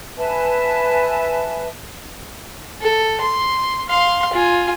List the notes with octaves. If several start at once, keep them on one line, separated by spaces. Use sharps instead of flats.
B4 E5 G#5 A5
A4
C6
F5 C6
F4 G#5